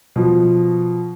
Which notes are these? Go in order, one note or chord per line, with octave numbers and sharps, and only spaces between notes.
B2 F3